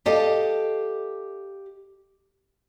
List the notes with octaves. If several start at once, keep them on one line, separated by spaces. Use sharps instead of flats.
G4 A4 D#5 F5 A5